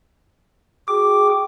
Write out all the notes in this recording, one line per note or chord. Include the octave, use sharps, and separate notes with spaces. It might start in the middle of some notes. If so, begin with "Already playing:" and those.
F#4 G#4 G5 D6